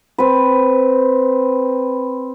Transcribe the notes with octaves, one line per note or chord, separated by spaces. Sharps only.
C4 B4